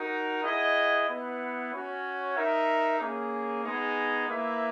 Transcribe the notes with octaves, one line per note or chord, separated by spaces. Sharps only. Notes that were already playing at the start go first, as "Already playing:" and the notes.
Already playing: D#4 F#4 A#4
E4 G#4 D#5 F#5
B3 E4 B4 F#5
C#4 F#4 C#5
D#4 A#4 E5
A#3 C#4 G#4
G#3 B3 D#4 G#4
A#3 E4 B4 E5